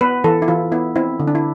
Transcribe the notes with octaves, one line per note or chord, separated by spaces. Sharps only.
B3 B4
E3 A4
E4
E3 F4
B3 E4
C4 E4
D3
D4
E4